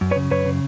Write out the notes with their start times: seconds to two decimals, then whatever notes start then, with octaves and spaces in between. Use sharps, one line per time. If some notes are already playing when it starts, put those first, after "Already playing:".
0.01 F#2
0.11 B4 C#5
0.16 C#3
0.31 F#2 B4 C#5
0.46 C#3